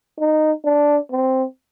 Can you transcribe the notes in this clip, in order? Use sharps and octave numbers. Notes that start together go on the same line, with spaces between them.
D#4
D4
C4